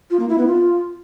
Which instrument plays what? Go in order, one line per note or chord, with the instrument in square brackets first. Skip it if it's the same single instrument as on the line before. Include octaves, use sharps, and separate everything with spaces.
[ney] F4
A#3
E4
B3
F4